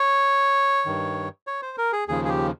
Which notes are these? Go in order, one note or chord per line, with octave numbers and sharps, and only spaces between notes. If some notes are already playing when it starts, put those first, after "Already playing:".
Already playing: C#5
G2 D#3
C#5
C5
A#4
G#4
D#2 C#3 F3 G#4
G#4
G4